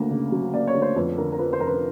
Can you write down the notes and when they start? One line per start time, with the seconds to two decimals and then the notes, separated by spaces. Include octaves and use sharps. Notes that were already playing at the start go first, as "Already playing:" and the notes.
Already playing: D2 A#3
0.10 C#3
0.32 F#3
0.54 A#3 D5
0.67 C#5
0.74 D2
0.82 C5
0.96 F2 B4
1.18 D3 A#4
1.32 A#4
1.39 F3 B4
1.53 C5
1.60 F1 A#4
1.67 B4